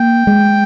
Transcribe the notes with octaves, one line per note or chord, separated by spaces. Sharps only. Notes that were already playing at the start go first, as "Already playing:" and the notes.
Already playing: A#3 G5
G#3